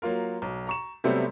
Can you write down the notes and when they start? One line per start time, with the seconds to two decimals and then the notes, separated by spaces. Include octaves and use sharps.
0.02 F#3 A#3 F4 A#4
0.42 B1
0.67 A#5 C#6 E7
1.04 C3 F#3 G3 A3 B3 C4